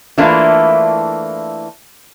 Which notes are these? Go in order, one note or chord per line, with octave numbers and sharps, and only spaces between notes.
E3 A3 A#3 D4 E4 F4